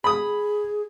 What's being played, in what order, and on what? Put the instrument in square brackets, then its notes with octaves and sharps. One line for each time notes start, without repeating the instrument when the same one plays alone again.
[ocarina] G#4 [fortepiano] B5 D#6